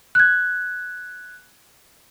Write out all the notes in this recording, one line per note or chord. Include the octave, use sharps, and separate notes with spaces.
F#6 G#6